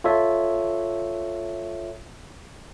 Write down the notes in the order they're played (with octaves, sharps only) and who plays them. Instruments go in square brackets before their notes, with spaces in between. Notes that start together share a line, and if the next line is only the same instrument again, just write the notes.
[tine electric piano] F4 A4 C#5 E5